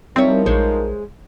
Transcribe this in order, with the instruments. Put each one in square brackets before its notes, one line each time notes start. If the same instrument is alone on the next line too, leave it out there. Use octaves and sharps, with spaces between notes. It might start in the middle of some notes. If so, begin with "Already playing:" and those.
[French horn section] F3 D#4 A#4 [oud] G3 E4 C#5 [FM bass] C4
[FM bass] A#1 [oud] G#3 C5 C#5